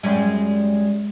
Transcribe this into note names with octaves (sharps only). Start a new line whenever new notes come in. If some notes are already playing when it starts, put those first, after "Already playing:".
F#2 G3 G#3